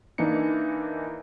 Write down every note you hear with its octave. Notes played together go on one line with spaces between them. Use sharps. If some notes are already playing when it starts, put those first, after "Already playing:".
E3 A#3 D4 D#4 C#7